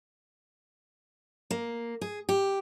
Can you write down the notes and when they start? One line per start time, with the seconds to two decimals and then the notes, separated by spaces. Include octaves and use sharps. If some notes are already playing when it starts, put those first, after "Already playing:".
1.51 A#3
2.01 G#4
2.29 G4